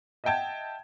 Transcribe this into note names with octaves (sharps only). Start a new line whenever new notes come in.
D#5 E5 F#5 G5 A5 G#6